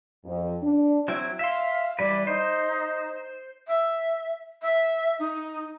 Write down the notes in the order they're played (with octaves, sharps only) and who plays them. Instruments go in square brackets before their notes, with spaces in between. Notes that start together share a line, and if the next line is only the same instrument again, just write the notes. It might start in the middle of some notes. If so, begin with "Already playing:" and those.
[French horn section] F2
D4
[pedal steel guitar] F#3 C4 E4
[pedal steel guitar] E5 C6 [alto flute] F5
[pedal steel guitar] E3 G3 B4 [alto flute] D5
[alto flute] D#4 [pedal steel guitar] C5
[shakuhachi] E5
E5
D#4